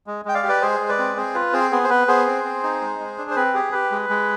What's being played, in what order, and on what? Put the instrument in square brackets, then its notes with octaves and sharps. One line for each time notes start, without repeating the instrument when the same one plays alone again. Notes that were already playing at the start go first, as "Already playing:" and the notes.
[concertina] G#3
G#3 G5
D5 F5
G4
B4 D5
G#3 G#4 C5
G#3
B4 D5
C4
C4 G#4 C5
F4 B4
C4 G#4 C5
B3 G#4
C5
B3 B4
B3 G#4 C5
C4
C4
D#4
G#3
G#3
D4
C5
C4 B4
G4 G#4
G4 B4
G#3
G#3